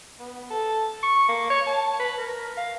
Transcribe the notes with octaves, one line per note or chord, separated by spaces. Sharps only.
B3
A4
C#6
A#3
C#5
A5
B4
A#4
F5